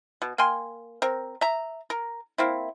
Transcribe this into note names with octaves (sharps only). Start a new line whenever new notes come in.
B2
A#3 G5 G#5 C6
C4 A#4
E5 A#5
A#4
A#3 C4 E4